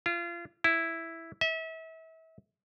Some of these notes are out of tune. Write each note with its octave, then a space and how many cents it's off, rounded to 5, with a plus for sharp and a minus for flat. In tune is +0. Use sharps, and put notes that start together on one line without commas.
F4 -30
E4 +0
E5 -35